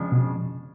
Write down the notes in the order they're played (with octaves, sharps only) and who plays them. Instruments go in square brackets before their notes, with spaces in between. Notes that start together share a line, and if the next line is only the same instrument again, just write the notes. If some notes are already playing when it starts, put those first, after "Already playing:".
Already playing: [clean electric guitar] F2 C#3 F3 G#3 D4
[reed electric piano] B2